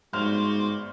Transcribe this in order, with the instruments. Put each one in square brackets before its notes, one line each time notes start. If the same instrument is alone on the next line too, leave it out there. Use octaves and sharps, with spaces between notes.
[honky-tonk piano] G1 G3 C5 [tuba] G#2 [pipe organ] F#4 C6 D6 [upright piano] F6